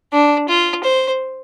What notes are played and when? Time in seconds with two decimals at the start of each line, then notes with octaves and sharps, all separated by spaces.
0.13 D4
0.49 F4
0.84 C5